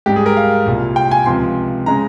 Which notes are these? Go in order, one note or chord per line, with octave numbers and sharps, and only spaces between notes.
G#2 G3 G4
G#4
A#4
F5
C2 A#2 G3
G5
G#5
C#2 C3 F3 C6
C#3 G#3 A#5